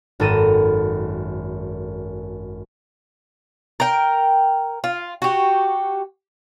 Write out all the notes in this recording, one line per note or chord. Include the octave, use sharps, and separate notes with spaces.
G#1 F#2 A4 A#5 D#7 E7
A#4 G5
F4
F#4 G4